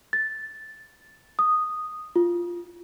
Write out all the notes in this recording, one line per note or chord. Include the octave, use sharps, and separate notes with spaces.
A6
D#6
F4